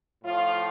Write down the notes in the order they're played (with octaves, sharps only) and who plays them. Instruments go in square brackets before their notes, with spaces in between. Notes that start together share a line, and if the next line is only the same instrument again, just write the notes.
[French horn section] A2 F3 F4